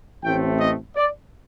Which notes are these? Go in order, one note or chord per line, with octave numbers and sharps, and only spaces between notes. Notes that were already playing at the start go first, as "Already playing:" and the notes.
A1 A2 A3 C4 G5
D#5
D5